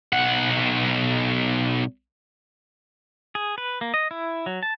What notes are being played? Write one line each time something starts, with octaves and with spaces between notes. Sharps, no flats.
B1 F#5
G#4
B4
A#3
D#5
E4
F#3
A5